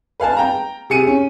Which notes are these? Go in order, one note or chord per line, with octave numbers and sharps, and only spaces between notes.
B4 F5 G#5 A5
G5 A#5
C3 G#4 C#7 D#7
C#4